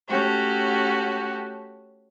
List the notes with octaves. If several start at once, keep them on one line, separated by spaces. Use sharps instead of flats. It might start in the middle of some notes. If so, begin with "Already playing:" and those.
A3 C#4 F#4 G4